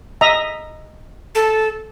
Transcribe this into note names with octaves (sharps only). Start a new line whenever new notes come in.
D#5 E5 A#5
A4